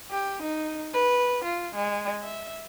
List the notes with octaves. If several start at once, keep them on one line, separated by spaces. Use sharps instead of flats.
G4
D#4
B4
F4
G#3
E5